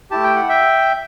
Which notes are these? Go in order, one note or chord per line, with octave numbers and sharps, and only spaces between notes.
A3 E4 G4 A5
G5
F#5
E5 G5